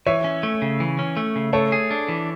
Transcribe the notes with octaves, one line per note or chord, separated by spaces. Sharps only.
E3 C#5 E5
C#4
A3
C#3
E3
C#4
A3
C#3
A3 A4 C#5
G#4
D4
E3